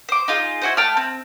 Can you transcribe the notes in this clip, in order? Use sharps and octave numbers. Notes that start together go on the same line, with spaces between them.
C5 D6
D#4 F4 G#4
E4 F#4 C5
A3 G5 A5 F6
C4